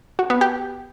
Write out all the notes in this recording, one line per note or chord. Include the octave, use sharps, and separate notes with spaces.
F#4
B3
G4